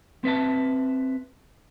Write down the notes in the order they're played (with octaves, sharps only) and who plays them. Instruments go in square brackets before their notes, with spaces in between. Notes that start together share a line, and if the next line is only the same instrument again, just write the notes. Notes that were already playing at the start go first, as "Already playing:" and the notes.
[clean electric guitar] C4 B4 E5 A5